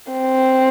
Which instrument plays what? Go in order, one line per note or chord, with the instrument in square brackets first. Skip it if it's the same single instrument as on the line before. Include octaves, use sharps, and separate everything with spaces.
[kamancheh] C4